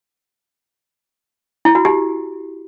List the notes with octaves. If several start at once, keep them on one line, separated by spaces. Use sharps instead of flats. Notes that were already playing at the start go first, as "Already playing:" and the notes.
E4
F#4
G4